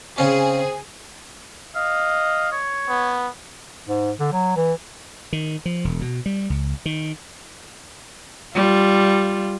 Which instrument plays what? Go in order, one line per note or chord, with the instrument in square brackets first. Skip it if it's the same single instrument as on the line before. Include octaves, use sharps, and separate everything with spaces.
[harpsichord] C#3 C#4 [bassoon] C4 [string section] G#4
[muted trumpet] D#5 [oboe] F5
[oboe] C#5
[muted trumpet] B3
[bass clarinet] G#2
D3
F#3
E3
[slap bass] D#3
F3
E1
B2
G3
C#2
D#3
[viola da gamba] G3 F4